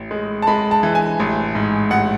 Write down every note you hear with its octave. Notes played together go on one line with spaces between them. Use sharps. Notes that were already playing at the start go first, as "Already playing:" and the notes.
Already playing: A1
G#3
A5
G#3 B5
A5
E3
G#5
A1
G#2
A1 F#5